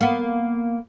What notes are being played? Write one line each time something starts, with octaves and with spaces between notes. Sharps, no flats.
A#3 B3